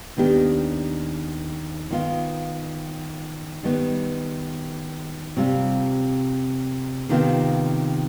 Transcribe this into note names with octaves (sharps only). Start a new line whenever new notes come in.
D#2 D#3 B3 D4 G4
D#3 B3 F4
D#3 G3 B3
C3 G3 C4 F4
C3 D#3 B3 F4